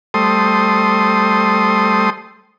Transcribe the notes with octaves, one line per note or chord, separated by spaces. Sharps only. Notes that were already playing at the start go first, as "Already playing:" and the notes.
G3 A3 A4 C5 C6 D#6